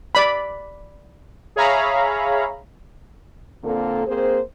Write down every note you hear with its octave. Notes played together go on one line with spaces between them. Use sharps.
D5 B5
G#4 C#5 E5 F5 A#5 B5
A#2 D3 A#3 C4 A4
A#3 C4 G#4 C5